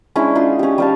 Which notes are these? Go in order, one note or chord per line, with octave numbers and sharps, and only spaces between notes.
G#3 C#4 D4 E4
D#4 F4 G#4 C6
C#4 G4
G3 F5 A5